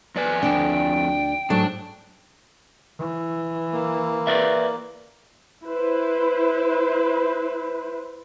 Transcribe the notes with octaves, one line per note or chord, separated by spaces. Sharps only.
F2 B4 D5 G#5
D2 D4 G5
G#2 F#3 A3 D4
E3
A#3
B4 D5 E5
E4 B4 C5